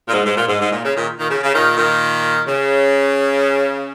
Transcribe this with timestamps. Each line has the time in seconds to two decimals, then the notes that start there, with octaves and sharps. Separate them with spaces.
0.09 A#2
0.13 G#2
0.25 G#2
0.36 A#2
0.48 G#2
0.60 G#2
0.72 A#2
0.83 C#3
0.95 A#2 D#3
1.18 A#2 D#3
1.30 C#3
1.42 C#3
1.53 A#2 D#3
1.76 A#2 D#3
2.47 C#3